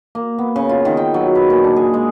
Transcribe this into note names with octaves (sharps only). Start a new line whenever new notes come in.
A#3
B3
C#3
F4
D#3
G5
F#3
B4
A#2
D4
G#4
G#3